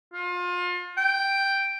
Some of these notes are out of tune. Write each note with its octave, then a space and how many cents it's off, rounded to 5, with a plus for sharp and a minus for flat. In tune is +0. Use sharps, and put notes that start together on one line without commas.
F4 +30
G5 +0